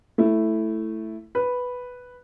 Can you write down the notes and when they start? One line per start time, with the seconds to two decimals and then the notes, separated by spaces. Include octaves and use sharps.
0.18 A3 E4
1.35 B4